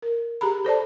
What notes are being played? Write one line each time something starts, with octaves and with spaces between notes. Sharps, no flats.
A#4
G4 G#4 A#5 B5
A4 C5 D5 A5